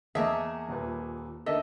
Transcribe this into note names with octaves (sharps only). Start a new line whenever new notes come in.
E2 A#3 G#4 D#5 E5 A5
D#1 A#2 B4
D#3 D4 A4 D#5 E5